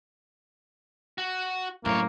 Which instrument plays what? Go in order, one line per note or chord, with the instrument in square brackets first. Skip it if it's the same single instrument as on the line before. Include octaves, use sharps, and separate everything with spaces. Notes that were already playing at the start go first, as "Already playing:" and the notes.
[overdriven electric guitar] F#4
[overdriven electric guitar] C2 C#5 [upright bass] F#2 A2 [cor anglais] A#3